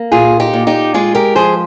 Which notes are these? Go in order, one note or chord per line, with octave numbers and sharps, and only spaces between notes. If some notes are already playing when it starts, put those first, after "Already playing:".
Already playing: A#3
A#2 F4 G#4
D#4 G4
A#2
D#4 G4
G#3 F4 G#4
G4 A#4
F3 G#4 C5